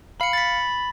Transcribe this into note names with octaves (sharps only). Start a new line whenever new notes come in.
F5 B5 C#7
A6 B6